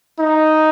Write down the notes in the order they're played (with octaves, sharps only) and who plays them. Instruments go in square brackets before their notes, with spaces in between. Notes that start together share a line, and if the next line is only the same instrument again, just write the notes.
[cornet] D#4